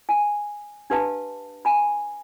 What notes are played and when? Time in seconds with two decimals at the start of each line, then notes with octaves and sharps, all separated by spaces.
0.09 G#5
0.90 D4 G4 B4 F5 A5
1.65 G#5 B5